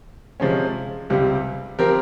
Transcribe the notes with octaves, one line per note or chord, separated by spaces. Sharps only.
C3 F3 G#3 C#4
C#2 C3 G3
F3 C4 G4 A#4